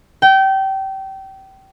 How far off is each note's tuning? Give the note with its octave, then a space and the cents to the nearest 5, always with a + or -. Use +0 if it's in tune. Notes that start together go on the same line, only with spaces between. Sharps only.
G5 -25